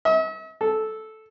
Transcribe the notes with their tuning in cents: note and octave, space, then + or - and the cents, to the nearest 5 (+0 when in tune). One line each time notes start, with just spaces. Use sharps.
E5 -45
A4 -10